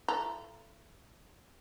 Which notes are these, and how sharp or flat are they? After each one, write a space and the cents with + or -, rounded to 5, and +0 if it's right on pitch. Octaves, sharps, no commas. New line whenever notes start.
E4 +45 A4 +0 A#5 +0